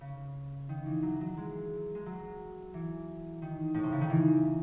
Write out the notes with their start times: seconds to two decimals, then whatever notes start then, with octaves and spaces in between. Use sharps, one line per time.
0.01 C#3
0.69 D#3
0.86 E3
1.03 F#3
1.21 F#3
1.37 G#3
1.95 G#3
2.06 F#3
2.74 E3
3.42 D#3
3.74 A2
3.83 C3
3.92 C#3
4.01 D#3
4.09 E3